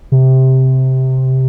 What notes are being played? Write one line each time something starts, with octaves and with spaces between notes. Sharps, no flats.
C3